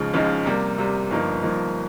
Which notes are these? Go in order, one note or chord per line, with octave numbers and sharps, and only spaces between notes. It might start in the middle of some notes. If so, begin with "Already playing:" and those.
Already playing: C#2 C#3 F3 G#3 D#4
C#2 C#3 F3 G#3 D#4
C3 G3 A#3
C3 G3 A#3
G1 G2 F3 A#3 D#4
G1 G2 F3 A#3 D#4